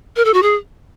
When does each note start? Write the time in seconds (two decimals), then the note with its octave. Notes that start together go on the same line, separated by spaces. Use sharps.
0.16 A#4
0.25 A4
0.34 F#4
0.43 G#4